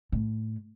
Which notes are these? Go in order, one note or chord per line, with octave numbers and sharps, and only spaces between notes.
A2